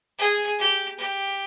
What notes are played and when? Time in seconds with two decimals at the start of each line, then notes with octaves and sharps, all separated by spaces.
0.19 G#4
0.59 G4
0.99 G4